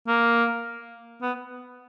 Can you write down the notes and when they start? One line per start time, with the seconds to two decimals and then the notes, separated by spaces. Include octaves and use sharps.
0.07 A#3
1.22 B3